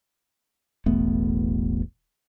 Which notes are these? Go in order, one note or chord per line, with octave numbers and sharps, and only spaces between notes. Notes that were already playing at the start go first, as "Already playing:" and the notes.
E1 A1 A3 B3